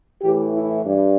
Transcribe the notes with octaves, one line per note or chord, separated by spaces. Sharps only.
A2 E3 G4
E4
G2